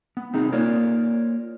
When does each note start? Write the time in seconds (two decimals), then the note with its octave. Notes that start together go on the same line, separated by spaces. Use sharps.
0.17 B3
0.33 C2 C4 D#4 G#4
0.52 A#3 F4 A#4 C#5 D5